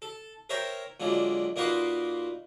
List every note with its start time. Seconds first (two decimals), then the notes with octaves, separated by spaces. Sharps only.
0.02 A4
0.50 A#4 C5 C#5 E5 G5 A#5
1.00 A#2 D3 F#3 G#3
1.56 A#2 A#3 D#4 F#4 B4 C6